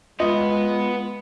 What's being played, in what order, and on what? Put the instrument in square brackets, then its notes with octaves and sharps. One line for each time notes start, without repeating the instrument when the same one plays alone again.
[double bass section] G#3 [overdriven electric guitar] B3 B4 [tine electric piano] F4 [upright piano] D#5